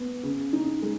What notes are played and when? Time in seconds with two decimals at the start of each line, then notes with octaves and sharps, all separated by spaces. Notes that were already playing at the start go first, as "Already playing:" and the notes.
Already playing: B3
0.23 C#3
0.53 D#4
0.82 G#3